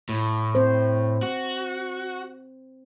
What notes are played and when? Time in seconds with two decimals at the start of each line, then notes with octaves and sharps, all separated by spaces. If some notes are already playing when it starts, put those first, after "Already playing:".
0.09 A2
0.55 C4 C5
1.22 F#4